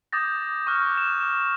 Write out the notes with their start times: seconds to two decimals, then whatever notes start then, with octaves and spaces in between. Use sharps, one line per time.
0.12 D6 D#6 G6 A6 A#6
0.67 C#6 D6 F6 F#6
0.97 E7